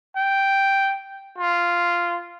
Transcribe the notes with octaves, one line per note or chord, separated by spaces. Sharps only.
G5
F4